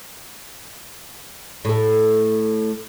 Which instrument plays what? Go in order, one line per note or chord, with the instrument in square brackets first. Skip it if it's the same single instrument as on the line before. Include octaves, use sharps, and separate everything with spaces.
[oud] A2 A4